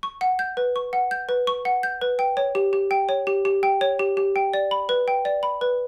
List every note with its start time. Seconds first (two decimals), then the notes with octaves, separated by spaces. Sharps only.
0.03 C#6
0.21 F#5
0.39 G6
0.57 B4
0.76 C#6
0.93 F#5
1.11 G6
1.29 B4
1.47 C#6
1.65 F#5
1.83 G6
2.01 B4
2.19 G5
2.37 C#5
2.55 G4
2.73 G4
2.91 G5
3.09 C#5
3.27 G4
3.45 G4
3.63 G5
3.81 C#5
3.99 G4
4.17 G4
4.36 G5
4.54 D5
4.71 B5
4.89 B4
5.08 G5
5.25 D5
5.43 B5
5.61 B4